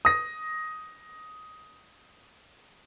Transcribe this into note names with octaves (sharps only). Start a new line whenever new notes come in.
D#6 A#6